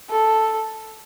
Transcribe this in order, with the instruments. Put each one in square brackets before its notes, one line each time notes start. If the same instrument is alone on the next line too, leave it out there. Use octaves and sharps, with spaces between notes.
[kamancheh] A4